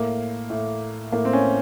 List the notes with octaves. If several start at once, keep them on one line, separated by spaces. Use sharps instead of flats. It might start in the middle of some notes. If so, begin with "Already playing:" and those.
Already playing: A2 A#3
A2
A2 A#3
C4
C#4